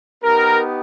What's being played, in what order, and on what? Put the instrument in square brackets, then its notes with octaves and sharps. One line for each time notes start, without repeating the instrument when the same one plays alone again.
[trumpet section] B3 D#4 G4 A#4